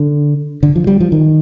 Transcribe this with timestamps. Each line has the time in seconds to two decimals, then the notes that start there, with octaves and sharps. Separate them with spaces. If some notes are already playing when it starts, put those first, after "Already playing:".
Already playing: D3
0.63 D3
0.76 F3
0.87 G3
1.00 F3
1.12 D#3